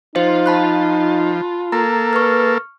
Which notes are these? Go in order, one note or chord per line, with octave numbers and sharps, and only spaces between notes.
F3 D#4 F4 C5
A5 B5 F#6
A#3 A4 A#5
B4 C#6 F6